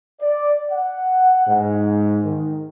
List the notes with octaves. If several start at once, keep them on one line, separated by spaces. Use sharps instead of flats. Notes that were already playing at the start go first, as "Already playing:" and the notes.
D5
F#5
G#2
D#3